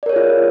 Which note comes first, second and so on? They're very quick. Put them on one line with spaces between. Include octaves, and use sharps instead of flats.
D5 A#4 C#5 G#4 F4